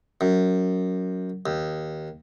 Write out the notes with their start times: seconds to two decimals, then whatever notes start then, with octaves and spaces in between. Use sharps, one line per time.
0.21 F#2
1.46 D#2